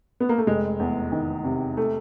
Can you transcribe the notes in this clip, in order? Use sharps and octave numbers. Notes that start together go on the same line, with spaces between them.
B3
A#3
A3
F1 G#3
E2
D#3
C3
A3